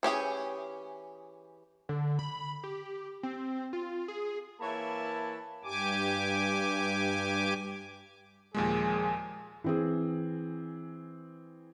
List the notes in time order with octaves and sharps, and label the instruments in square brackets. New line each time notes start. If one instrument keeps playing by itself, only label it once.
[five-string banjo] E3 C#4 G4 G#4
[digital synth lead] D3
B5
G4
C4
F4
G#4
[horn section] E3 A#3 C#5 E5 A5 B5
[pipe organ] G2 G4 G#5 D6
[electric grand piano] D#2 A#2 G#3 [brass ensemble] F3 G#4 G#5
[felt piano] E3 C4 G#4